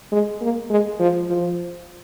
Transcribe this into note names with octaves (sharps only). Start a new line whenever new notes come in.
G#3
A#3
G#3
F3
F3